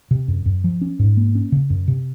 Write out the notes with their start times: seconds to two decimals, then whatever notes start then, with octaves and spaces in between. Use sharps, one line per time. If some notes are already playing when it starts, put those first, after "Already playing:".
0.11 C3
0.28 F#2
0.46 F#2
0.64 F3
0.81 C#4
0.99 G#2
1.17 A#3
1.35 C#4
1.52 C#3
1.70 F#2
1.88 C3